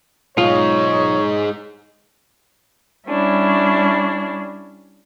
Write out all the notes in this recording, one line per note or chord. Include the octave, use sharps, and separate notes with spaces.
B1 G#3 D#4 F4 C#5
G3 C#4 D4 E4